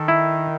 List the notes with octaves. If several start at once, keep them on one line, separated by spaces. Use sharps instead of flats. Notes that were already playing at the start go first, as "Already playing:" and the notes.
Already playing: D#3 A4
E4